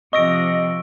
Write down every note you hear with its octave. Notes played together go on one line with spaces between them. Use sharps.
C3 F3 D#5 C#6 E6 A#6 D7